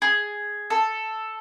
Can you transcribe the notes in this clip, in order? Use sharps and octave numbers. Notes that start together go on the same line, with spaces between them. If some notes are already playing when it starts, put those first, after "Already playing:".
G#4
A4